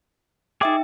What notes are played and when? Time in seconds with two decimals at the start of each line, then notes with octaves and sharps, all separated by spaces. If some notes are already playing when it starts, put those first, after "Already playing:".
0.61 D#4 G#4 E5 G5 D6